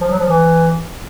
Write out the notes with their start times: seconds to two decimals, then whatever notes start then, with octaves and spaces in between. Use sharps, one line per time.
0.01 F3
0.10 F#3
0.19 F3
0.28 E3